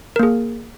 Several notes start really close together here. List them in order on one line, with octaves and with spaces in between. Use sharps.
A#4 A#3 G#4